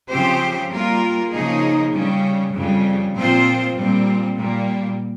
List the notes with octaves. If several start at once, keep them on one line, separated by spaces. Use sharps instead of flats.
C#3 F3 C4 G4 C5
G3 A#3 F4 A#4
C#3 F3 A#3 D#4 G#4
C#3 G3 C#4
F2 C#3 G3
A#2 F3 C4 F4 C5
A#2 G3 C4
A#2 G3 A#3